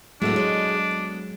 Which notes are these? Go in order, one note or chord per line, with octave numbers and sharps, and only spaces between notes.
A2 F#3 G#3 A3 B3 D4 F#4
G#3 C#5
B3